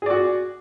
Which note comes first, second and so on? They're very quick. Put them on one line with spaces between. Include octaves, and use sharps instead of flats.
G#4 D5 F#4